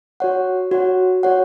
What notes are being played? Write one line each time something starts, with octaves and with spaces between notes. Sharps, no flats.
F#4 C#5 F#5
F#4 C#5 F#5
F#4 C#5 F#5